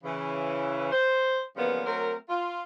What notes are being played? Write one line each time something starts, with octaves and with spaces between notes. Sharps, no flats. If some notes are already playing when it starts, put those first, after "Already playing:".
C#3 E3
C5
C#3 E3 F3 G3 A#3 B3
F#3 A3 C4 A#4
F4